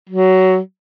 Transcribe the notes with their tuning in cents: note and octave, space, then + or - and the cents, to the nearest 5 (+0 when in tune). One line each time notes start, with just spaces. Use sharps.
F#3 +15